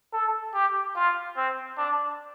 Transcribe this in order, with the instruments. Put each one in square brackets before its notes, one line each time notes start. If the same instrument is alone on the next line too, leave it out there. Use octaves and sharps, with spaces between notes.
[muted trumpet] A4
G4
F4
C4
D4